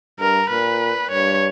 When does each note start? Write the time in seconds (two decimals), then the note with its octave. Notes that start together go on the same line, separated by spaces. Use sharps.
0.19 G2 A#4
0.50 A#2 B4
1.11 G2 C#5